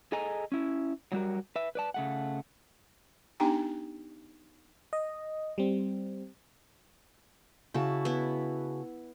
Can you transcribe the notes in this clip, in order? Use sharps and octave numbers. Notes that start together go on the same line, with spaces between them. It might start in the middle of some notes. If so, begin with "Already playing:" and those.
G#4 A4 D#5 G#5 A#5
C#4 E4
F#3 G3 F#4 A#4
B4 E5
B4 D5 A5
C#3 A3 F#5
B3 D4 D#4 G4 G5 A#5
D#5
G3 C4
C#3 E4 F#4 A5
B3 E4